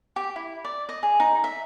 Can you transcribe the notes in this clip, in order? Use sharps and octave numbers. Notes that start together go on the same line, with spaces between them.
G4
E4
D5
D#5
G#4
D#4
E5